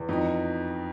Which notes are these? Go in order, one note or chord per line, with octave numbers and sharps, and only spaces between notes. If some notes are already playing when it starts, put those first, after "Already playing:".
Already playing: E2
F2 D#4